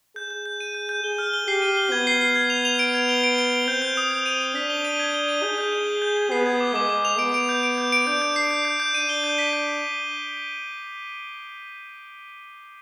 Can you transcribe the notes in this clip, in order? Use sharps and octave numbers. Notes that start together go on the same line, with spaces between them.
G#4 G6
G6
G6
D#7
G6
G6
G#4 G7
F6
G7
G4 C7
D#7
G7
B3 G#6
C7
C7
G#6
F7
F7
D7
G#6
G7
D7
D7
G7
C4 G6
G6
D#6
G6
D#7
D#7
D4 B6
G7
D#7
G#6
G7
D#7
G#4 G6
G6
G7
G7
G6
G6
B3 C7
G#6
D6
G#3 D6
D6
F7
B3 D7
D7
G6
D7
G6
D7
D4 G6
G6
C7
G6
G6
G6
D4 D#7
G7
G6
B6
G6